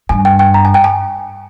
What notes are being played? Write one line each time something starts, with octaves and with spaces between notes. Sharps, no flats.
G2 G#5
G5
G5
A#5
G#5
G5
G#5